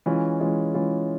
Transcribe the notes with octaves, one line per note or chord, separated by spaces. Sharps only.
E3 G#3 C#4 F4
E3 G#3 C#4 F4
E3 G#3 C#4 F4